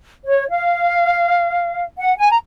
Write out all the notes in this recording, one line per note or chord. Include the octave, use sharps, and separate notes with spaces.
C#5
F5
F#5
G#5
A#5